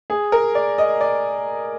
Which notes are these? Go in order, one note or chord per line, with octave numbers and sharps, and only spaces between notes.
G#4
A#4
D5
D#5
D5